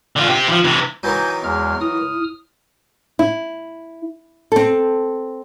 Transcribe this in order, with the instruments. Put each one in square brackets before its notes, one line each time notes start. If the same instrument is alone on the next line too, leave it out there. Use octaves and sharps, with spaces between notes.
[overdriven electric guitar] D3 F4
C4 G4
E3 F3
C3 E3
[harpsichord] D#3 E3 F#3 [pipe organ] G#5 G6
[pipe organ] E2 G#3 F6
[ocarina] E4 [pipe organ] D#6 F6
[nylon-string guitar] E4
C4 A4